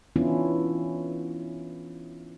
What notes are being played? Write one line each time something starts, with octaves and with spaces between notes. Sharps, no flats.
E3 B3 C#4 D4 E4 F4